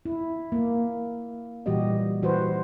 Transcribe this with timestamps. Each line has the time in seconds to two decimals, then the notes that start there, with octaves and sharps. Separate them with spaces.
0.05 E4
0.52 A#3
1.66 A#2 E3 G3 F#4 G4 D#5
2.22 E3 F#4 B4 C5